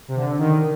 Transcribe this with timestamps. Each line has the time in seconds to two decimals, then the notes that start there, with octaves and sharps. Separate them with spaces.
0.08 C3
0.16 D3
0.39 D#3